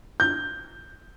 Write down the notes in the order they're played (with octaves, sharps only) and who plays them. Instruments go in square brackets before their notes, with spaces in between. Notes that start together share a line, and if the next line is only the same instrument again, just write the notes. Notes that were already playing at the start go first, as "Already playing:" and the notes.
[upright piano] G6